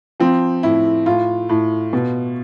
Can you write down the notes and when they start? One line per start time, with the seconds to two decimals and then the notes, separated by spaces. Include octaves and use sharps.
0.20 F3 C4
0.63 A2 E4
1.06 A2 F4
1.49 A2
1.93 B2